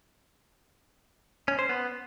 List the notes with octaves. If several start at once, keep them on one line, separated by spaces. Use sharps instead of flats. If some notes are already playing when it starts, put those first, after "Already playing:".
C#4
C5
B3